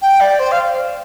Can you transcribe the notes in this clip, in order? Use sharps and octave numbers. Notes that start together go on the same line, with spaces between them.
G5
D5
C5
F5